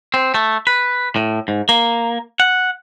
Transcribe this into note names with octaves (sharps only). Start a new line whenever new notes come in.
C4
A3
B4
A2
G#2
A#3
F#5